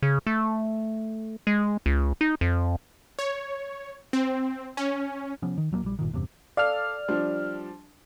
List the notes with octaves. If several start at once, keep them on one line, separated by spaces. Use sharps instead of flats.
C#3
A3
G#3
C#2
D#4
F2
C#5
C4
C#4
C3 F3 B3 C#4
D#3
D#1 F#3 A3 A#3
A#1 G3
G1 A#2 D#3
E2 G2 C3
A4 D5 F5 F6
F3 G3 D4